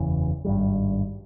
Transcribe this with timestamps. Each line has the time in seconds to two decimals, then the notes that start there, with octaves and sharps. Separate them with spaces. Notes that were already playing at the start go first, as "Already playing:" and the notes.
Already playing: F#1 E2 C#3 E3
0.45 G#1 G2 D#3 G3